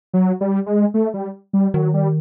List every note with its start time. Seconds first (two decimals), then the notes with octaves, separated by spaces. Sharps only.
0.13 F#3
0.41 G3
0.66 G#3
0.94 A3
1.14 G3
1.53 G3
1.74 D#3 F#3
1.94 G3